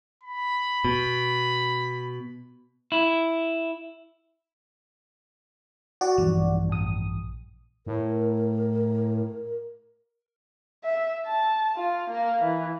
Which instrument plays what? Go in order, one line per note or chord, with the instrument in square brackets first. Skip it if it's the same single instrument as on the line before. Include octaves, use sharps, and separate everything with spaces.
[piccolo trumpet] B5
[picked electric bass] B2
[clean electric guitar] E4
[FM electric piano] F#4 D5
[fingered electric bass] A#1 G2 E3
[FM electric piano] A1 D#6
[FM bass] A2 [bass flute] A#4
[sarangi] E5
A5
F4
A#3
E3